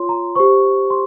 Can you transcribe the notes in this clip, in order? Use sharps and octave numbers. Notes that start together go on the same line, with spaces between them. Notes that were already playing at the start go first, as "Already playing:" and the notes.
Already playing: F4 C#5 C6
A#5
G4 C5 C#6
C6